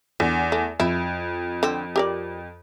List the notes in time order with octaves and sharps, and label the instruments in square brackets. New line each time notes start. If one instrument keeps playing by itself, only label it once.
[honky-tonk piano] E2 [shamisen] D3
[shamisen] A3
[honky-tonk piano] F2 [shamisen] E4
[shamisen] D3 C4
G4 A#4 D5